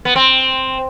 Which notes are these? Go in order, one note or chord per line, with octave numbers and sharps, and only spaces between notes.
B3
C4